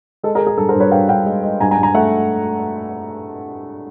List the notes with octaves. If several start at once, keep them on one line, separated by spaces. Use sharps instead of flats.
G#3 A4
G#4 A#4
G#3
G#4 A#4
G2 A4
A#4 C5
G2
B4 C#5
G2 F5 G5
G2 F5 G5
G#3
G#3
G2 G#5 A#5
G#5 A#5
G2
G#5 A#5
A3 E5 F#5